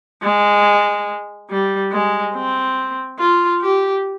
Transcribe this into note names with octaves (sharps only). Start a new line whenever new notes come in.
G#3
G3
G#3
C4
F4
G4